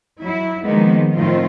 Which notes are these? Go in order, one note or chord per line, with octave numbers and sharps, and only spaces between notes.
F#3 E4
D#3 F3 G#3 A#3 B3 D#4
A2 D#3 F3 C4 F4